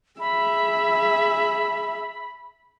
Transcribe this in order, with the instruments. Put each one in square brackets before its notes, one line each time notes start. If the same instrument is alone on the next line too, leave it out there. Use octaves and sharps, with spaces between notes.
[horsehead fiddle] G#4 E5 [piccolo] B5